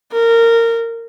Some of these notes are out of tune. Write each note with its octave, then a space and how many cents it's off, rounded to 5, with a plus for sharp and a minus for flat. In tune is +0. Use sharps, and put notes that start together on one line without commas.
A#4 -20